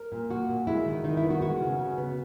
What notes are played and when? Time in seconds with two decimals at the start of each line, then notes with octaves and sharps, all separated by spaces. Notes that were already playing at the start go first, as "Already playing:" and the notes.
Already playing: A#4
0.12 A#2
0.30 A#3 F#4
0.49 A#2
0.67 G#3 E4
0.86 D#3
1.04 D#3 D#4
1.17 E4
1.23 B3
1.30 F#4
1.42 G#3 F#4
1.61 C#3
1.79 C#3
1.98 B3